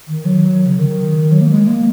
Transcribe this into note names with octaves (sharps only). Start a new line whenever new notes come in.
D#3
F#3
C#3
D#3
F#3
A#3
G#3
A#3